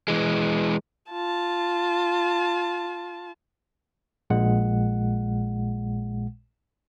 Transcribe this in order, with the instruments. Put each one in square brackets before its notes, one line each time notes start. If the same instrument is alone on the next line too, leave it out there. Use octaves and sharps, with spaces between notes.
[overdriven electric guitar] E3 G#3
[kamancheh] F4 A5
[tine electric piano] A#1 A#2 G#3 F#5